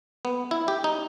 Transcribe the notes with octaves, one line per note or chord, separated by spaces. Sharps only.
B3
E4
G4
D#4